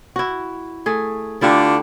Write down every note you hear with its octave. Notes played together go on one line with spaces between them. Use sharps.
E4 F#4
A3 G#4
D3 A3 D4 E4 F4 G4